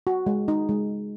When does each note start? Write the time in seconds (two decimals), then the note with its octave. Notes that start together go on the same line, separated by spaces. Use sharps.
0.07 F#4
0.26 G#3
0.48 D#4
0.69 G#3